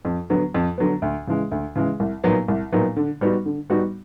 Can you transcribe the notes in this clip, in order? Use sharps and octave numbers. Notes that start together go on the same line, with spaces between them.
F2
D3 F#3 B3
F2
D3 F#3 B3
D2
C#3 E3 G#3
D2
C#3 E3 G#3
C2
A#2 F#3 B3 D#4
C2
A#2 F#3 B3 D#4
D3
G3 B3 D#4 F#4
D3
G3 B3 D#4 F#4